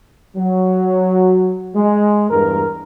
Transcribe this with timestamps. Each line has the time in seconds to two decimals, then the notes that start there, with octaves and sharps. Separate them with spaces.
0.37 F#3
1.75 G#3
2.30 E2 G2 A#4